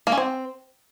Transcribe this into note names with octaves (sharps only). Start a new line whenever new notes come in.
A#3
C#4
C4